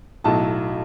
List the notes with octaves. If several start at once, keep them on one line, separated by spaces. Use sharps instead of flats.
B1 A2 F#3 A5